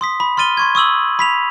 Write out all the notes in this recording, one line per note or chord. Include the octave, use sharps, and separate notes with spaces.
C6 D#6 B6
B5
C6 F6 A6 D#7 G7
C6 C#6 G#6
C#6 D#6 E6 F#7
B5 B6 F7